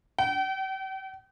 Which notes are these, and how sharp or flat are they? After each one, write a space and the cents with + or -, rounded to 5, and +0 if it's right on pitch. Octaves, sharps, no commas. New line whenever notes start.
G5 -40